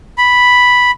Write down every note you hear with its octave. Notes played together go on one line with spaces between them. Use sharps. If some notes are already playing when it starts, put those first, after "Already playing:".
B5